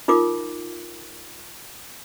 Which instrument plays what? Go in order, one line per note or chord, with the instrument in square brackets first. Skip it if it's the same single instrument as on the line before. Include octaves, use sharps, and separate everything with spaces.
[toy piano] D#4 F4 A#4 D6